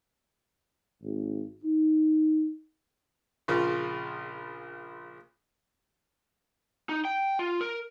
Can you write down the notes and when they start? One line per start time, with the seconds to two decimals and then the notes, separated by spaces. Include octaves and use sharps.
1.02 G#1
1.63 D#4
3.48 A#1 C#3 F3 F4 A#4
6.89 D#4
7.05 G5
7.39 F4
7.61 A#4